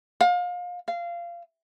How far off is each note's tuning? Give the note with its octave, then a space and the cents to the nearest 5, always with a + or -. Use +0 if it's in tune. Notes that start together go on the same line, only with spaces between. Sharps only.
F5 +30
F5 -20